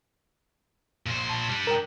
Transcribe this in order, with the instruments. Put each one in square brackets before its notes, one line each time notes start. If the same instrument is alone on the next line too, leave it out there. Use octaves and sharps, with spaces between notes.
[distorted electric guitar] A#2 C5
[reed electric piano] A5
[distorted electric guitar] G3 D4
[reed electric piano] A#4 G5